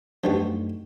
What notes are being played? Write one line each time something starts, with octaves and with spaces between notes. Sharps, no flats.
F#2 F3 G3 A3 B3 D4 D#4 F#4